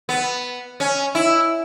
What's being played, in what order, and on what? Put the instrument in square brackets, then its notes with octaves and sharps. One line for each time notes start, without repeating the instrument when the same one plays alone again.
[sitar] B3
C#4
E4